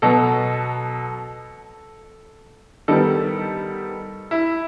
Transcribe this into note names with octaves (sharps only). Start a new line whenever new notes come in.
B2 F#3 B3 A4
D#3 G3 B3 A4
E4